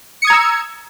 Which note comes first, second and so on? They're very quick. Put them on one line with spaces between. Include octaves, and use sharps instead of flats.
C#7 D#6 G#6 A#5 E6